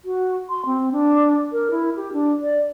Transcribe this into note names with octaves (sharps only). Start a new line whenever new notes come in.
F#4
C6
C4
D4
A#4
E4
G4
D4
D5